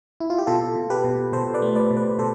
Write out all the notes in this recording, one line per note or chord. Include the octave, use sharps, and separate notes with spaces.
E4
F4
G4
B2 F4 A4
B2
G4 B4
B2
B2 A4 C5
B4 D5
A3
B4 D5
B2
B4 D5
B2 A4 C5